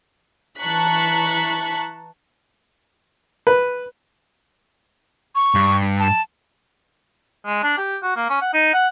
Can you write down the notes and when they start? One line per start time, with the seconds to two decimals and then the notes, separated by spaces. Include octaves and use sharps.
0.59 E3 A5 A#5 C#6 F#6 B6
3.47 B4
5.35 C#6
5.54 G2
5.99 A5
7.46 G#3
7.63 D4
7.78 G4
8.03 F#4
8.16 A#3
8.30 C#4
8.41 F#5
8.54 D#4
8.74 F#5